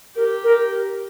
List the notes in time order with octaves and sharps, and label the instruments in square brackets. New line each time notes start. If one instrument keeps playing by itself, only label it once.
[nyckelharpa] G4 [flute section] A#4
[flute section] A#4